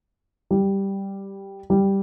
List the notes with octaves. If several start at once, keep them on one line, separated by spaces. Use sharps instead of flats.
G3
G3